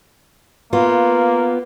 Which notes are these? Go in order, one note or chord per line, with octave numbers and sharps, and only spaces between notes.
A#3 B3 F4